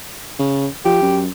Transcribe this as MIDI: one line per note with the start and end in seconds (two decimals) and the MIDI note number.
0.39 0.67 49
0.85 0.97 53
0.85 1.20 67
1.02 1.28 42